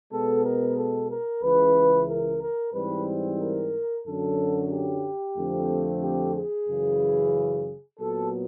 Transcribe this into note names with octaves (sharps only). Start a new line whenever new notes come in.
B2 G#3 B3 A4
A#4
A4
A#4
C#2 C#3 E3 B4
A#4
A#4
G#2 E3 G3 C4 B4
A#4
F#2 D3 F#3 A4
G4
F2 D3 F3 A3 C4
G4
G#4
F#2 C#3 E3
A#2 F#3 B3 A4